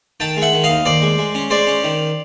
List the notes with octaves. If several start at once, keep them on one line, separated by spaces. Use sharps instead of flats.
D#3 G5 A5
G#3
E5 F#5
D#3
D#5 F5
D#2
D#2 C5 D5
G#3
G#3
C#4
G#3 C5 D5
C#4
D#3